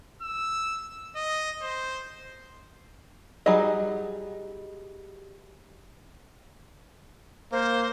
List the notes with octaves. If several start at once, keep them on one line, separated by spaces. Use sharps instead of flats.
E6
D#5
C5
F#3 G3 D#4 G#4 D#5
A#3 C5